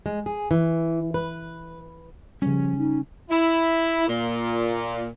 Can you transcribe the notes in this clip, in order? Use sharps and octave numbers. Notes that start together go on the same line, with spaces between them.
G#3
G#4
E3
B4
C#3 F3 G3 C#4
D#4
E4
A#2